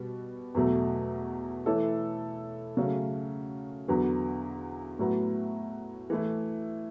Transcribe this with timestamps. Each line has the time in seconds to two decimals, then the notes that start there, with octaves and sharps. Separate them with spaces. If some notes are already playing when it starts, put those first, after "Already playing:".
Already playing: B2 G3 B3
0.55 E2 B2 F#3 A3
1.66 E3 A3 E4 A4 C#5
2.77 C#3 F#3 A3 C#4
3.88 E2 D3 F#3 B3
4.99 A2 F#3 B3
6.10 E3 A3 E4